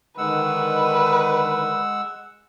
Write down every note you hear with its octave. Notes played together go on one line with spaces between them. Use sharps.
D3 D#3 G#3 B4 F#5 E6